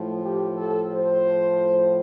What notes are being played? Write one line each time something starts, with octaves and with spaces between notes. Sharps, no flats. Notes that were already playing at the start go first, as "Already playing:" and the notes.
Already playing: A2 F3
G4
A4
C5